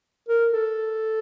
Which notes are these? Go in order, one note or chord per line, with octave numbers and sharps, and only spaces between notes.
A#4
A4